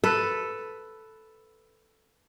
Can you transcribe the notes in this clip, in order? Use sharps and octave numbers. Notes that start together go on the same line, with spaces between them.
A4 B4